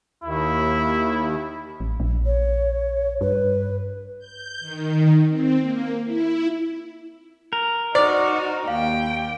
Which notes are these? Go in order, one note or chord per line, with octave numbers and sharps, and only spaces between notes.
D#2 E4
A1
A#1
C#5
G2 B4
G6
D#3
C4
A#3
E4
A#4
D#4 F#4 C5 D5
D#2 F5 G5